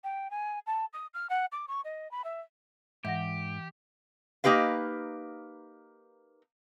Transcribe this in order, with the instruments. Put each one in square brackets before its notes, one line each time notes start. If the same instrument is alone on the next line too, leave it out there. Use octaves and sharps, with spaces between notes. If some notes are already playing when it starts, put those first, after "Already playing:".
[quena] G5
G#5
A5
D#6
F6
F#5
D6
C#6
D#5
B5
E5
[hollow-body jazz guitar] G#2 [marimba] E3 F#5 A#6 [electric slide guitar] G4
[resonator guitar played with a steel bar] A#3 D#4 G4 B4 F5